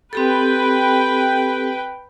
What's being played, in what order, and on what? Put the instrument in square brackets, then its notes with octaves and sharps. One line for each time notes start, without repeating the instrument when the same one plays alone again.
[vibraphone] C4 G4 A4 [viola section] B4 G5